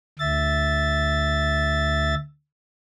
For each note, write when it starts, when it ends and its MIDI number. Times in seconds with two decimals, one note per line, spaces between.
0.19 2.15 38
0.19 2.15 76
0.19 2.15 93